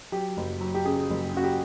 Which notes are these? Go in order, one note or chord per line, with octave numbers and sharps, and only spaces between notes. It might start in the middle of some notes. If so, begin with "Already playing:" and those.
F#3 G4
F#1
F#3
G4
C#3 G#4
F#1
C#3 F#4
G4